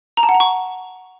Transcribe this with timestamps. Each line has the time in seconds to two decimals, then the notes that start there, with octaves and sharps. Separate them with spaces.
0.17 A#5
0.23 A5
0.29 F#5
0.34 A#5
0.40 C#6